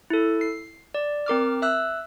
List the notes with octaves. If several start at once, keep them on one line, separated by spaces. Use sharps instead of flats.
E4 A4
C7
D5
C4 A#4 D6 F6
E5 E6 F#6